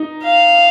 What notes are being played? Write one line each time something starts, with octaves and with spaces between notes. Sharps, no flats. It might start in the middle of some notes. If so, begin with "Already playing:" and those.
Already playing: D#4
F5